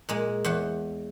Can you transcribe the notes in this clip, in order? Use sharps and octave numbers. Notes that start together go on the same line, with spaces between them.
A#2 G#3
E2 C5 F#5